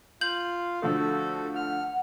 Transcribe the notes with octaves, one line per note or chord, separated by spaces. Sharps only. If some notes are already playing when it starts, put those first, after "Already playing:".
F4 F5 G6 F#7
D3 F3 A3 F#4 A4
F#5 F6